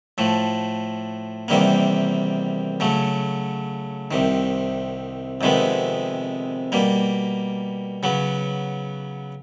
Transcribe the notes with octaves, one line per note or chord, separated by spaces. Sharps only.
A2 F3 A3
E2 C3 D#3 G3 A#3
C#3 F#3 A3
C2 C3 D#3
F2 C3 D#3 G#3 B3
B2 G3 A#3
C#3 F#3 B3